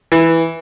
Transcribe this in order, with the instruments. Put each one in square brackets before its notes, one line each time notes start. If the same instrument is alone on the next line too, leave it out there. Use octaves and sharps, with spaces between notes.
[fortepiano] E3